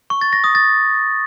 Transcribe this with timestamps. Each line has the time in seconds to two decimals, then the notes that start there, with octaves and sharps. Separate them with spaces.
0.10 C#6
0.21 A6
0.33 A#6
0.44 D#6
0.55 A6